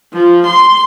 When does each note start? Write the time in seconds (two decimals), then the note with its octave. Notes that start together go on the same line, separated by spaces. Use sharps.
0.14 F3
0.47 C6